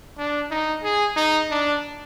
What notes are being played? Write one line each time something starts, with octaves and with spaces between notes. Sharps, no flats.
D4
D#4
G#4
D#4
D4